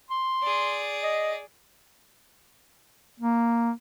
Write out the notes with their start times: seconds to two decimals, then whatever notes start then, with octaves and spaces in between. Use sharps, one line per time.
0.10 C6
0.43 G#4 D5
1.03 D#5
3.20 A#3